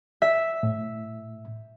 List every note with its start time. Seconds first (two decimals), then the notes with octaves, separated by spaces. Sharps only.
0.22 E5
0.63 A2